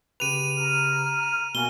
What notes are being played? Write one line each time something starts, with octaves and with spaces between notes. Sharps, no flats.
C#3 G4 B4 D#7 F7
A#5 F6
B2 A#3 F#4 G#5 G7